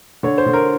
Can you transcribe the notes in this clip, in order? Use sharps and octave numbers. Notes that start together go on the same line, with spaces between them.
D3 C#5
C5
D3
A#4